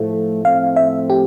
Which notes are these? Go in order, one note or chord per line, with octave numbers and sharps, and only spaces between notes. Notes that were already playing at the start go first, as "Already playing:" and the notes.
Already playing: A2 F3 A3
A2 F3 A3 C4 F5
E5
G4